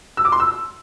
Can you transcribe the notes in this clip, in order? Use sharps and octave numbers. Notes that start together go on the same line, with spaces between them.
E6
D6
C6
E6